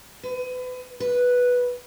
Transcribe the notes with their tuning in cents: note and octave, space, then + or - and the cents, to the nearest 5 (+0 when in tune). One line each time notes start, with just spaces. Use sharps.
B4 +35
B4 -5